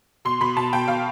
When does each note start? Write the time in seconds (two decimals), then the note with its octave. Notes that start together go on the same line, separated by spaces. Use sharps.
0.25 B2 C6
0.41 B2 B5
0.57 B2 A5
0.73 B2 G5
0.88 B2 F5